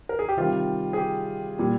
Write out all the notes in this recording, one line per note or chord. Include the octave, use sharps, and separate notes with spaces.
A#4
G#4
G4
C3 D#3 G3 F4
G#4
G4
A#2 G3